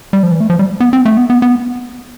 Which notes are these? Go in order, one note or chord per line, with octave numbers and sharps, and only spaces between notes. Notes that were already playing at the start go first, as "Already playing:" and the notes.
G3
F3
E3
A3
F3
G3
B3
C4
A3
B3
B3
B3